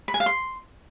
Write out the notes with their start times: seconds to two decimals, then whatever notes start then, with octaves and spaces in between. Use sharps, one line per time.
0.08 B5
0.14 G#5
0.20 F5
0.26 C6